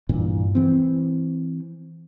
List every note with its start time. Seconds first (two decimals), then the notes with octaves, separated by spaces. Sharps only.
0.09 G2 A#2 E3
0.55 E3 C4